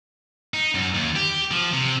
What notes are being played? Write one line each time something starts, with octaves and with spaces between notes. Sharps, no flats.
D#4
F#2
D#2
G4
F3
C3